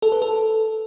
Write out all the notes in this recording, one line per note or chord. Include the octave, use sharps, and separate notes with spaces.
A4
B4
A4